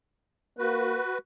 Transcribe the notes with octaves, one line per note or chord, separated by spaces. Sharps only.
A#3 F#4 B4